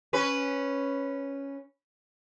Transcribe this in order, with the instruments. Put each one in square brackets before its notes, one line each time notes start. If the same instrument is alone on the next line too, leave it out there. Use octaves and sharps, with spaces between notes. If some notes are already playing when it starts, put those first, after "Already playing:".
[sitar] C#4 B4